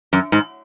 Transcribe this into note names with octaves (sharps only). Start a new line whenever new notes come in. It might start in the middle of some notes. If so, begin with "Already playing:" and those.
F#2
G#2